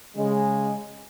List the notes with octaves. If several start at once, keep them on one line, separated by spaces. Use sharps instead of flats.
C#3 G#3